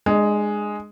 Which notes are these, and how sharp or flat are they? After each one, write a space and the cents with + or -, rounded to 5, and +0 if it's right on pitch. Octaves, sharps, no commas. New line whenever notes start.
G#3 +0 D4 +35